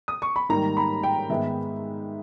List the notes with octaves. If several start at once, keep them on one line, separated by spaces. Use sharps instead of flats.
D#6
C#6
B5
G#2 D#3 G3 A#3 A#5
B5
G5
G#2 D#3 G#3 B3 E5